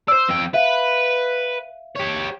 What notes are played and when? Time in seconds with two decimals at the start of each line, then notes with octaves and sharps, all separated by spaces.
0.08 C5 D5 E6
0.29 F2 G5
0.54 B4 E5 F5
1.96 G4 C#5